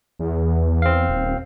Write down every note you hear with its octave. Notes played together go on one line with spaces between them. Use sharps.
E2
C4 F5
D#1